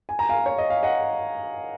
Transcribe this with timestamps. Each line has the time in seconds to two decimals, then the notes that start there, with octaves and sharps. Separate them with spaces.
0.09 G#5
0.19 A#5
0.29 F5 G#5
0.46 C#5
0.58 D#5
0.70 F5
0.83 D#5 F#5